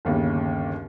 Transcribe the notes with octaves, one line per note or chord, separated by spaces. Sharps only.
G1 D#2 C#3